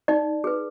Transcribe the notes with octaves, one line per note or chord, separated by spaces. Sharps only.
D#4 D5
G#4 B4